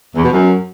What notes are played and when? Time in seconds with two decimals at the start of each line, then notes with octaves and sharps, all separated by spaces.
0.15 E2
0.23 B2
0.31 F#2